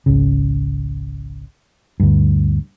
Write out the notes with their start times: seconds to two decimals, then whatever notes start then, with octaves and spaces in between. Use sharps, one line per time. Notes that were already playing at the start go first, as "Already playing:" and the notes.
0.06 G#1 C#2 C#3
2.00 D2 G2